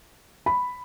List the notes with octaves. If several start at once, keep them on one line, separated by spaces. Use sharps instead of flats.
B5